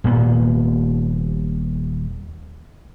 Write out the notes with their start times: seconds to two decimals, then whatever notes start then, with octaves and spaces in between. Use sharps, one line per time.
0.04 D#1 A#2 B3